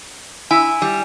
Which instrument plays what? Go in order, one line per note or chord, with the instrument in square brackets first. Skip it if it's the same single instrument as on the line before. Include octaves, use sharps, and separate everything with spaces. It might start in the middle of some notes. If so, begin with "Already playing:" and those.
[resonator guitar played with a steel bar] E4 [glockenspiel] G#5
[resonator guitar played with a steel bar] G3